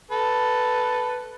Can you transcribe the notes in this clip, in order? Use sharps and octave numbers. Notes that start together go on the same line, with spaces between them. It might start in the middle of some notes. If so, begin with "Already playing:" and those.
A4 B4